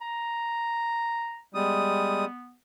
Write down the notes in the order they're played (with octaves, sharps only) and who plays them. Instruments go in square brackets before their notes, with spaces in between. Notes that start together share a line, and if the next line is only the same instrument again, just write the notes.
[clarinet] A#5
[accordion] G3 G#3 D#6 [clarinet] B3